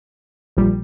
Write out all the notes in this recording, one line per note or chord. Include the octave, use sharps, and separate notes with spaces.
A#1 A#2 G3